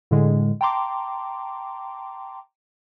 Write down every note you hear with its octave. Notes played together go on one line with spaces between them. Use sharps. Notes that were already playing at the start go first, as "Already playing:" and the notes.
A2 D3 G#3
G5 A5 A#5 C6 D6